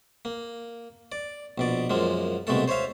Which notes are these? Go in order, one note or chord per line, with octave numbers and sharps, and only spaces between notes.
A#3
D5
A#1 B2 D5
F#2 F3 G#3 A#3
C2 B2 G#3 A3 A4
C5 C#5 E5 F5